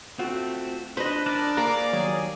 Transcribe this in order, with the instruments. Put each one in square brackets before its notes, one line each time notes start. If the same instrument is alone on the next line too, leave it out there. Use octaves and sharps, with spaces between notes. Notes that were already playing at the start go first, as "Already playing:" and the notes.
[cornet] A3 [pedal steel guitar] C4 [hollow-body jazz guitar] F4 F#4
[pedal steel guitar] D4 [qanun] B4 D#5 [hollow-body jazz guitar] C5
[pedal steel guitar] D4 A#4 A5 [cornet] D5
[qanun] A#3 D6 [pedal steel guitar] G#4 A#4 F5 [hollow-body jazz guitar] A#5
[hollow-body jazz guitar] D#2 F#3 [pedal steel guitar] G#4 G#5